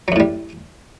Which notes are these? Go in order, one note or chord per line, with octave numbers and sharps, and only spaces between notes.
F#2 A2 F#3 G3